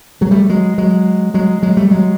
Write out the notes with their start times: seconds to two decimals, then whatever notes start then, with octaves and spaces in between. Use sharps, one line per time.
0.21 F#3 G#3
0.31 G3 A3
0.50 F#3 G#3
0.78 F#3 G#3
1.34 F#3 G#3
1.63 F#3 G#3
1.77 G3 A3
1.91 F#3 G#3